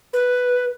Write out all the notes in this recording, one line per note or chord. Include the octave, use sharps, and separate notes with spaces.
B4